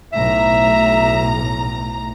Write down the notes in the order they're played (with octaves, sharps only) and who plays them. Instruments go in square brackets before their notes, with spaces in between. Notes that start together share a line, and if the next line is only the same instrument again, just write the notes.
[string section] B1 A2 A#5 [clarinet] E5